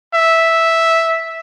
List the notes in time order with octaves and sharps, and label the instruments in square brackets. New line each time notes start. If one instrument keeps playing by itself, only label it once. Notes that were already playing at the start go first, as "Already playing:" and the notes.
[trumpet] E5